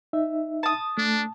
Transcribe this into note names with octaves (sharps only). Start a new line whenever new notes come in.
D#4 E5
A5 D#6
A3 D4